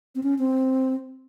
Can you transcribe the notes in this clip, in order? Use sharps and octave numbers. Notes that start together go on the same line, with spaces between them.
C4
C#4
C4